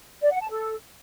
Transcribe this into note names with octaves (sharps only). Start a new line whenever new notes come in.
D5
F#5
A5
A4